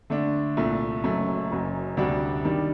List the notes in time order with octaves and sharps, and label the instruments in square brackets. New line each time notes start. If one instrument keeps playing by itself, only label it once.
[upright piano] D3 A3 D4
C2 A#2 A3
F#1 F#2 F#3 A3
F#1 F#2 F#3
D2 C3 G3 D4 F#4
D#3 G3 D4